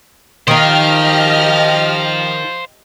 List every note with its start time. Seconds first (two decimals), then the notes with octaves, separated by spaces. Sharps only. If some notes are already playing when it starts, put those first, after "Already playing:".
0.48 D#3 D#4 G4 C5 D#5 F5 F6